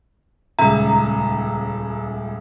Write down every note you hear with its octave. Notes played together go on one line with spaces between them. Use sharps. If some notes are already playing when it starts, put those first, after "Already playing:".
D#1 C#2 E5 A#5